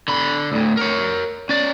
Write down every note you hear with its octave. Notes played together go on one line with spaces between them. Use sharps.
D3 B5
D2 A2
A#4 C#5
C#4 D5